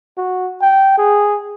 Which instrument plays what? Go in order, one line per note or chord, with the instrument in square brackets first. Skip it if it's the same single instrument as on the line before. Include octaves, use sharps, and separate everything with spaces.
[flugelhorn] F#4
G5
G#4